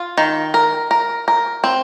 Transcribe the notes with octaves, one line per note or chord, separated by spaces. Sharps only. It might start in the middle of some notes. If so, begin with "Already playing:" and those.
Already playing: F4
D#3
A#4
A#4
A#4
C4